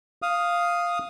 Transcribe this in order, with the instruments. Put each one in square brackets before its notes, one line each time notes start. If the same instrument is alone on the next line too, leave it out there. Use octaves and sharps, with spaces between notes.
[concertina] F5 D#6